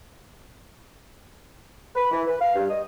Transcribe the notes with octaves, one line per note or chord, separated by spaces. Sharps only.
B4
E3
B4
F5
G2
D#5